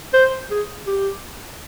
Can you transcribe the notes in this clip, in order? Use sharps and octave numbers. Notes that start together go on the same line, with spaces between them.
C5
G#4
G4